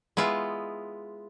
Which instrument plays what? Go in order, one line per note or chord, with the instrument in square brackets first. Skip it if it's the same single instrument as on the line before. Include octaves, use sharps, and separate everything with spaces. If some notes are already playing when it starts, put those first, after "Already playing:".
[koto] G#3 B3 E4 F4